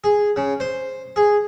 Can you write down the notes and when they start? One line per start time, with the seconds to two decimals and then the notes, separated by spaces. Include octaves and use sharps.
0.04 G#4
0.36 C#3
0.60 C5
1.16 G#4